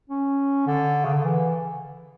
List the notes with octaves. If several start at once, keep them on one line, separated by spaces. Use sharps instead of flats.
C#4
D3
C#3
D3
E3